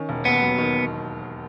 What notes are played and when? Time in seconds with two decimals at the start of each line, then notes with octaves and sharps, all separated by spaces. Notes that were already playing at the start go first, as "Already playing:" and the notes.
Already playing: D#3 C#4
0.09 E1
0.25 D#2 B3
0.42 F#3
0.58 D#3